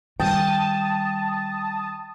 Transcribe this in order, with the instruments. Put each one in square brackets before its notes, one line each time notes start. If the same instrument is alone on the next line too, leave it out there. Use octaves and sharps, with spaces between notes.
[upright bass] D#3 G3 [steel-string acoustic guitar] G5 [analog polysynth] A5 D#6